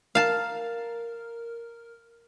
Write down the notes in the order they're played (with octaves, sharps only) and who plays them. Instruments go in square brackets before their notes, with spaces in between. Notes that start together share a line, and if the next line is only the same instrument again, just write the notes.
[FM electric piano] A#4 F6 [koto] F5 A5